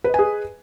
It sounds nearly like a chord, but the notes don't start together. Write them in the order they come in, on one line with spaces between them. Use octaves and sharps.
B4 D#5 G#5 G#4